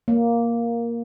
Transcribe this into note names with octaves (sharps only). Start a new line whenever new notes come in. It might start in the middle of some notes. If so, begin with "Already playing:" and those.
A#3